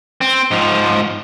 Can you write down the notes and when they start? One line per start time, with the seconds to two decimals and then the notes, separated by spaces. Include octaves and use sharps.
0.21 C4
0.51 G#2 F3